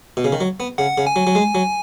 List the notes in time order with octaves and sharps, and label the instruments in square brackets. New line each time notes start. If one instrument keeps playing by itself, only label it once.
[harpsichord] B2
C#3
D#3
F#3
B3
[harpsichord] C#3 [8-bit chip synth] F#5
[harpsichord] C#3
[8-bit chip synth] G#5
[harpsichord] F#3
F#3
G#3
F#3